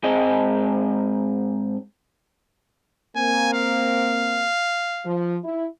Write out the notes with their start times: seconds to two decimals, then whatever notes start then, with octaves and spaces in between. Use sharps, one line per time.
0.03 G#2 G#3 C4 G#4 D#5
3.16 A#3 C4 G#5
3.53 F5
5.05 F3
5.44 E4